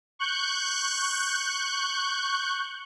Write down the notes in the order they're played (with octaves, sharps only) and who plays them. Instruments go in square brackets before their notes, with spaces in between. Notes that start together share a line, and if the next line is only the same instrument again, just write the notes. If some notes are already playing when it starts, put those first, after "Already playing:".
[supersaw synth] C#6 F#6 G6